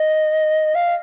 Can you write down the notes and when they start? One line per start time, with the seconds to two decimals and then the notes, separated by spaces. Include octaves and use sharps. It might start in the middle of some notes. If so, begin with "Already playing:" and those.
Already playing: D#5
0.75 F5